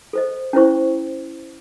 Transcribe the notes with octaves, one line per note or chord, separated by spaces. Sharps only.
A4 C5 D#5
C#4 E4 C5 C#6